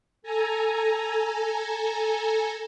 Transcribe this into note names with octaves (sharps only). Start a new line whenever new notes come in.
A4 G#5 A#5